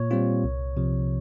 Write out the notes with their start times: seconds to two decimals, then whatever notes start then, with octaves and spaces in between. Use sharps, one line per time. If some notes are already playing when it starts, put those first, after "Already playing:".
Already playing: A#2 C#5
0.11 G3 C4 F4
0.44 C2
0.77 C3 F3